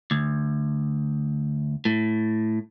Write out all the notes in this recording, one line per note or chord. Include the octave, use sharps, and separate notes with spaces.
D2
A2